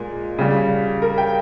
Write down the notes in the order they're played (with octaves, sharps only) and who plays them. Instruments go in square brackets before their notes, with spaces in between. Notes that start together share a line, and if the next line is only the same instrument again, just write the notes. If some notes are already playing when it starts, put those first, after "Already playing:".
Already playing: [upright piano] A#2 G#3
C#3 G3
A#4
G5